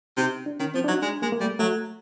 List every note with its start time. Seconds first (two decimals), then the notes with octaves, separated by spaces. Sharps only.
0.17 C3 D#4
0.46 D4
0.59 D#3 C#4
0.74 F3 C4
0.84 D4
0.88 F#3 D#4
1.02 G#3 D4
1.22 G#3 A#3
1.32 A#3
1.40 G3 A3
1.59 F#3 A3